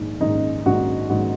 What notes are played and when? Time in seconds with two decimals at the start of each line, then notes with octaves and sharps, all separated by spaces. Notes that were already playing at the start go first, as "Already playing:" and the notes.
Already playing: A#1 G#2 D#3
0.20 A#1 G#2 D#3 D#4
0.66 A#1 G#2 D#3 F#4
1.09 A#1 G#2 D#3 F#4